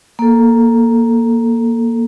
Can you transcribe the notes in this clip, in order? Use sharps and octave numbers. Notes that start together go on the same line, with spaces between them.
A#3 A4